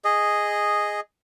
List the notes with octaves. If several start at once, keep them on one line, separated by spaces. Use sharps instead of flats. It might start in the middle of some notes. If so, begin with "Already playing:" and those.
G#4 D#5